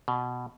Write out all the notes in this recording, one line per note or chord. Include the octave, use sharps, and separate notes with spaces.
B2